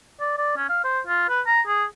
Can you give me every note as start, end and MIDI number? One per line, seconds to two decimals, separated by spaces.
0.20 0.34 74
0.38 0.55 74
0.57 0.68 61
0.69 0.84 77
0.84 1.00 72
1.07 1.25 65
1.29 1.41 71
1.46 1.61 82
1.67 1.84 68